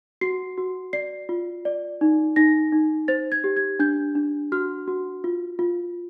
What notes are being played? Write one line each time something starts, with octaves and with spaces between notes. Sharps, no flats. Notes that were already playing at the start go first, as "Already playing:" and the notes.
F#4 C7
F#4
D5 C7
F4
D5
D#4
D#4 A#6
D#4
C5 A6
G#6
G4
G#6
D4 G6
D4
F#4 F6
F#4
F4
F4